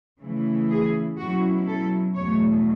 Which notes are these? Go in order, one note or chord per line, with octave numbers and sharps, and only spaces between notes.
C#3 E3 A3 E4
G#4
B2 F#3 C#4 E4 F#4
A4
E2 B2 F#3 A3 C#5